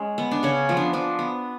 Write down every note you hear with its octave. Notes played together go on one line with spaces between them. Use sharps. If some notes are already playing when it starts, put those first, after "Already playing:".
Already playing: G#3 C#4
B3
D4
C#3 C#4
F3 B3
D4
F3 D4
B3